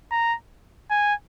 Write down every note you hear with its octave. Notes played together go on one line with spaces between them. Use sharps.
A#5
G#5